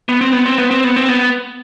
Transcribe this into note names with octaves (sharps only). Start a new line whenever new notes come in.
B3
C4
B3
C4
B3
C4
B3
C4
B3